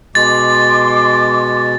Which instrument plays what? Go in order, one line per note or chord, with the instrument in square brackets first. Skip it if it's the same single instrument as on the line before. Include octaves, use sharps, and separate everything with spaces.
[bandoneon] B2 G#3 [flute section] C6 D6 [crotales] A6